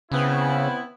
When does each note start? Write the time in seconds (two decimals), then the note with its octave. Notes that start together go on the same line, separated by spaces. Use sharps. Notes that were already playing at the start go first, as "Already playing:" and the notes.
0.12 C#3 B3 C4 E4